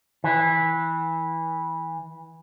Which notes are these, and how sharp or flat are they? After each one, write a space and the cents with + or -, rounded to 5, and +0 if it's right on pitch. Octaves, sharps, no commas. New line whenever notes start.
E3 -15